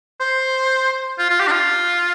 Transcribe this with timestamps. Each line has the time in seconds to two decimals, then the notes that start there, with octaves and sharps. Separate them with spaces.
0.20 C5
1.19 F4
1.30 F4
1.40 G4
1.47 D4
1.51 F4